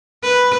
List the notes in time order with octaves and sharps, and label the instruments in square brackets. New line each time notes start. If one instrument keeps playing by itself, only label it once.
[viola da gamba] B4